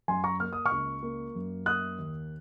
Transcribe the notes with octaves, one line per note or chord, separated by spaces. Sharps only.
F#2 G#5 C6
A#5 C#6
A#3 F6
D#6
C#6 F6
C#2
A#3
F#2
A#3 D#6 F#6
D#2